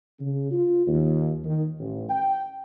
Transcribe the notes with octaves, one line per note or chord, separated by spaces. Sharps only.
C#3
F4
D#2
D#3
A1
G5